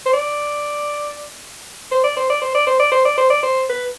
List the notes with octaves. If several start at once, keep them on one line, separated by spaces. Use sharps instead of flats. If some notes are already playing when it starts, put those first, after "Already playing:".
C5
D5
C5
D5
C5
D5
C5
D5
C5
D5
C5
D5
C5
D5
C5
B4